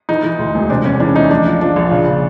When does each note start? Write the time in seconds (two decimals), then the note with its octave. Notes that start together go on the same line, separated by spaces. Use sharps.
0.09 E3 D#4
0.24 E3
0.39 D2
0.55 E1
0.70 C3 D4
0.85 E2 C#4
1.00 E3 D4
1.15 A3 D#4
1.30 A#1 D4
1.46 F3
1.61 F3 D4
1.76 A#1
1.91 C#3
2.06 C#3